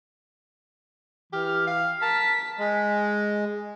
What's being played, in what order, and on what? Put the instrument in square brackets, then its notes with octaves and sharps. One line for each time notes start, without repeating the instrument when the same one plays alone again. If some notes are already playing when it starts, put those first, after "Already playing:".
[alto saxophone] E3 [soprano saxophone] G4 [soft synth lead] F6
[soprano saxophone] F5
[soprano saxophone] A#4 [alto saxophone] A5 [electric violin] B6
[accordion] G#3